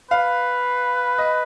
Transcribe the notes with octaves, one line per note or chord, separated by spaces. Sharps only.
B4 F5
D#5